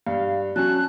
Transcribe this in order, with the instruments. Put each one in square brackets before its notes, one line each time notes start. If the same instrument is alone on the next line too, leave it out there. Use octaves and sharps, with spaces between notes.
[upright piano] G2 [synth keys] F5
[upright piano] F#3 [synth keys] C#4 A5 [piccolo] F#6